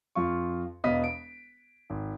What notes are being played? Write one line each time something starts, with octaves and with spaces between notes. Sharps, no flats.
F2 F4 C#6
E1 B3 D#5 F5 D#6 B6
D7
G#1